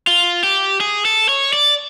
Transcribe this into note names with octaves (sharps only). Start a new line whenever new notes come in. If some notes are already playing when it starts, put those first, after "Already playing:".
F4
G4
G#4
A4
C#5
D5